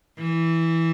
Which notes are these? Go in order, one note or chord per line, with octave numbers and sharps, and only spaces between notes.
E3